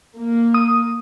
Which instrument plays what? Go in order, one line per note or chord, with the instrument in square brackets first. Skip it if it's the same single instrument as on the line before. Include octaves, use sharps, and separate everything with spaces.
[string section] A#3
[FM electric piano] D#6